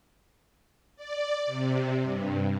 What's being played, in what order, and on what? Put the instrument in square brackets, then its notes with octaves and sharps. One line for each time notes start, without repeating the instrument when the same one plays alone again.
[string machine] D5
C3
G2